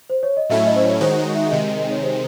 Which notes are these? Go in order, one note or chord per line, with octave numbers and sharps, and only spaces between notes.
C5
C#5
D#5
A2 F#3 A3 C#4 E4 E5
D#5
C5
C#5
D#3 G#3 D#4 F#4 C5
C#5
E5
C3 D#3 G#3 D#5
D#5
C#5
C5